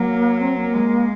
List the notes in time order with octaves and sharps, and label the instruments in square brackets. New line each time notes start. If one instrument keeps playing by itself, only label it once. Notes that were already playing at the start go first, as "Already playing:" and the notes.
Already playing: [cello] F#3 [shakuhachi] A#3
[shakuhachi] C4
A#3
[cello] G#3